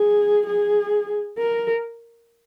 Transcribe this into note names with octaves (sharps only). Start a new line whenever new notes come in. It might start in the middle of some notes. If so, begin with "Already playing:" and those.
Already playing: G#4
G#4
A#4